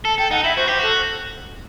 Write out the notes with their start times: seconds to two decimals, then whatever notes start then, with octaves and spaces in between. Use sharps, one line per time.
0.05 A4 A5
0.18 A4 G5
0.31 D#4 F#5
0.44 E4 E5
0.57 F#4 C5
0.68 G4 C5
0.79 F#4 A4